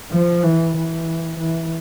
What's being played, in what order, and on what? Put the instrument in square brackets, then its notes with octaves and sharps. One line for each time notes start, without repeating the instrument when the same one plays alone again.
[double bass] F3
E3
E3
E3